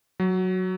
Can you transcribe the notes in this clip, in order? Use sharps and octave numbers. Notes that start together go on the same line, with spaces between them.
F#3